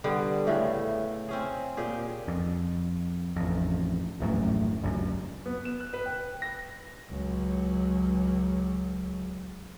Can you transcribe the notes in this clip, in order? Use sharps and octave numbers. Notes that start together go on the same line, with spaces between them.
D3 G3 B3
A2 C#3 A3
C4 C#4 G#4
A#2 G4 G#4
F2
A1 F2
D#1 A1 F#2 A2
G1 C#2 F#2
B3
E7
F#6
B4
G5
A#6
C#2 F#3